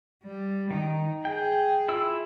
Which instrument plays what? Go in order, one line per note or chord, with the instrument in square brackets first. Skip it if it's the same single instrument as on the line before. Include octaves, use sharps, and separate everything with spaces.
[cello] G3
[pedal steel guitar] D#3 [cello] D#4
[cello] G#4 [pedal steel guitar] G5
[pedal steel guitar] E4 F4 E6